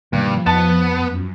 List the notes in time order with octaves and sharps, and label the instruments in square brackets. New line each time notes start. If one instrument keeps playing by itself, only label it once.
[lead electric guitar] G2 [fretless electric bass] B2 D#3 A#3 [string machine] F3
[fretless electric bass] F2 [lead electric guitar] B3 [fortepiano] A5
[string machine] F#2